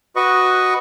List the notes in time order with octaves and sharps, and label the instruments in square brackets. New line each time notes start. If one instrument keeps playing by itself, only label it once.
[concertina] F#4 B4 D#5 C#6